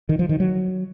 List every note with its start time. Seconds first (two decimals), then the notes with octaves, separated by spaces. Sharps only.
0.09 D#3
0.19 F3
0.29 D#3
0.40 F#3